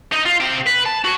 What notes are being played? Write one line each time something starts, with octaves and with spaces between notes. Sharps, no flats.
D#4 D#5
F4
C3 G5
B4
A5
F#4 C#5